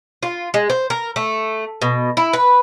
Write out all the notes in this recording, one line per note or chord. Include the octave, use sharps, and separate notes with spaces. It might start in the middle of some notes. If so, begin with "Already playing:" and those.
F4
G#3
C5
A#4
A3
B2
E4
B4